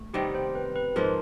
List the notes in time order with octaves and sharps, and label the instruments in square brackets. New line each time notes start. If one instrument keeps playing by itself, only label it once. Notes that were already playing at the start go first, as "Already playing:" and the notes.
Already playing: [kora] A3
[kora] C3 D#3 G3 B3 [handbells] G4
[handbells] C5
B4
B4
[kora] G#2 F3 A#3 D#4 [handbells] A#4